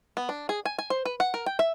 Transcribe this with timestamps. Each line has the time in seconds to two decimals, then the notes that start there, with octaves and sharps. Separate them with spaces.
0.17 B3
0.29 D4
0.49 G#4
0.65 G#5
0.78 G#5
0.90 C5
1.05 B4
1.20 F#5
1.34 A#4
1.46 G5
1.59 E5